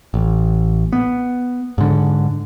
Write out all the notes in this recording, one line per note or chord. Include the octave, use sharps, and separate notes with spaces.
A1
B3
G#2 D3